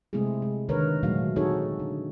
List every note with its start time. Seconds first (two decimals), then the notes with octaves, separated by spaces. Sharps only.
0.13 C3 G#3 A3 C4 E4 G#4
0.42 G#3
0.69 D3 D#3 A#4 B4 C#5
1.03 A#2 F#3 G#3 A3 F#4 F5
1.36 C4 D#4 F#4 G#4 A4 C#5
1.80 D3